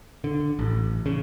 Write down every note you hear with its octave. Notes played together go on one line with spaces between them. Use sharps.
D3
A1
C#3